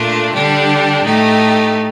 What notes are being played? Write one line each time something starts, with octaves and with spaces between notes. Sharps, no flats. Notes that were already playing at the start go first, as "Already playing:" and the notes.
Already playing: A#2 A3 D4 F4
D3 G3 D4 G4
A2 A3 D#4 G4